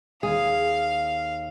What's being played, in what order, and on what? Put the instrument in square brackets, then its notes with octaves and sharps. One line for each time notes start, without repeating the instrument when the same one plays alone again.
[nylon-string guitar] D#2 [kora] G#4 [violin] F5